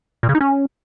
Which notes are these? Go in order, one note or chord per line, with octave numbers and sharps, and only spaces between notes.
A#2
C#3
D#4
C#4